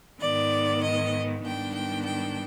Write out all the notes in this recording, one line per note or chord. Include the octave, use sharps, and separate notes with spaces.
G#2 D#3 B3 D5
D#5
G#2 D#3 G3 B3 D4 G5
G5
G5